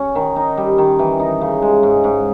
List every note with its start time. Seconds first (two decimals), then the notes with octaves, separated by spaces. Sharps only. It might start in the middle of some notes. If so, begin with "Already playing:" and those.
Already playing: C#4
0.15 D#3
0.36 D#4
0.57 G3
0.78 D#3
0.99 E3
1.19 D#4
1.41 C#3
1.62 G#3
1.83 G#2
2.04 G#2